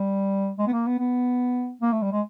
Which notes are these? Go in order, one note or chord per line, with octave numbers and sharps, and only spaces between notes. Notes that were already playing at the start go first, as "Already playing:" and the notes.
Already playing: G3
G#3
B3
A#3
B3
B3
A#3
A3
G3
G#3